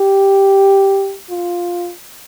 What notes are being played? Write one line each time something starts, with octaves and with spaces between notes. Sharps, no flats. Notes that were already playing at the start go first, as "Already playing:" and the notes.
Already playing: G4
F4